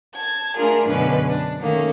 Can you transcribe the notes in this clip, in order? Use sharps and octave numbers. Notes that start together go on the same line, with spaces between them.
A5 G#6
A3 D4 F4 G#4 A#4
F#2 B2 D3 G#3 C#4 B4
D4
D#3 A3 A#3 C#4